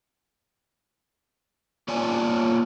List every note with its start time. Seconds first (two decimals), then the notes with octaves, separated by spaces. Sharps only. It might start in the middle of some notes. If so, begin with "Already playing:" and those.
1.88 A#3 F4 C#5 D5 G#5 A5